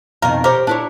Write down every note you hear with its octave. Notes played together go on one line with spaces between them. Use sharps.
F2 B2 D#3 A#4
G4 A#4 C5 C#5
D4 E4 C#5